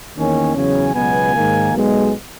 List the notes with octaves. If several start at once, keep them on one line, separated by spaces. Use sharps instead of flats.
E2 D#3 A#3 C#4
E2 C#3 F#3 C#4 G#5
C#2 B2 F#3 B3 G#5
G#2 D#3 A#3
B1 B2 G#3